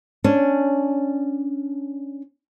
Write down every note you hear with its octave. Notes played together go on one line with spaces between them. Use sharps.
C#4 D4